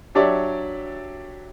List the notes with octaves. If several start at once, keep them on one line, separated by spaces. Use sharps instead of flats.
F#3 D4 G4 C#5 D5 E5